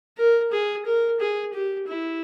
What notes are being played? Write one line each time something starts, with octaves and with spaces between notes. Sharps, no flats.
A#4
G#4
A#4
G#4
G4
E4